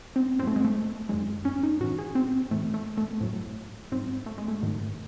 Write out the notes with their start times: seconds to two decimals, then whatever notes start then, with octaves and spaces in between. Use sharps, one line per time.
0.16 C4
0.39 G#2 C4
0.43 F#3 A3
0.56 G#3
0.65 A3
1.09 F#2 D#3 F#3 G#3
1.45 C#4
1.63 D#4
1.80 A2 E3 F#4
1.99 G#4
2.15 C4
2.51 A2 E3 A3
2.74 A3
2.97 A3
3.21 A2 F#3
3.92 G#2 F#3 C4
4.26 A3
4.38 G#3
4.48 A3
4.63 G#2 D#3 F#3